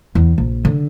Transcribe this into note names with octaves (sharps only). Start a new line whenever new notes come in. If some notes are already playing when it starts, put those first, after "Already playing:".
E2
A#1
D3